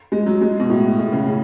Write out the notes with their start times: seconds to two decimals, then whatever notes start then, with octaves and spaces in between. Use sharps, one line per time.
0.12 G#3
0.26 F#3
0.41 G#3
0.60 B2
0.69 A2
0.98 A2
1.13 C#3
1.26 C#3